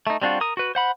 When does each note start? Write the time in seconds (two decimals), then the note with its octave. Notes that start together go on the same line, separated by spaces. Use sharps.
0.07 A3 D#4
0.22 G3 C4 D4 F4 F#4
0.41 A#4 D#6
0.57 F#4 B4
0.75 C5 F#5 B5